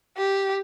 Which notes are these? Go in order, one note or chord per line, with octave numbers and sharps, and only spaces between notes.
G4